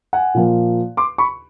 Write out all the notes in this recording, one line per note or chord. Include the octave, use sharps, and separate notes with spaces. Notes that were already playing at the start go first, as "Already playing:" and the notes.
F#5 G#5
A#2 F3 A#3
C6 D6
B5 C#6